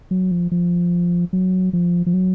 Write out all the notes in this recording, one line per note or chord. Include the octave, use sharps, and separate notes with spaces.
F#3
F3
F3
F#3
F3
F3
F#3